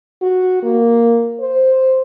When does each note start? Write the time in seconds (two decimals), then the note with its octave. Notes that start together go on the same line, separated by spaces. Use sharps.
0.22 F#4
0.63 A#3
1.40 C5